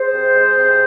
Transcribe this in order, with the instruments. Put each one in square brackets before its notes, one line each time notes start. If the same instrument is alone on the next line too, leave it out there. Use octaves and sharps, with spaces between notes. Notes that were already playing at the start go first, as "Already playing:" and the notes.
Already playing: [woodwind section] G#4 C5
C3
G#3
C3